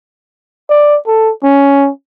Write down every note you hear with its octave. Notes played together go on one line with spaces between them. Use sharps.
D5
A4
C#4